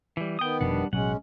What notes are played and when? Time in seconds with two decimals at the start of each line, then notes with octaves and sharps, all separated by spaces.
0.17 E3 G3
0.39 D#3 B3 G5 D#6
0.61 F1 F2 B2 G3 D4 F#5
0.93 A1 B2 F#3 G#3 C#4 F#5